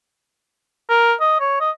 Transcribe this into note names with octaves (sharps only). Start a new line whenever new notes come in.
A#4
D#5
C#5
D#5